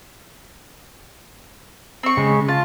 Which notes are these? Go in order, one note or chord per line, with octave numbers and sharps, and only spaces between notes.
C4 C#6
C#3 G#3
F4 A5